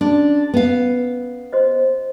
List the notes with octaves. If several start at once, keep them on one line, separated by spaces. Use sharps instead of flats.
C#4 D4 F#4 G#4
B3 F5
F#4 C5 D#5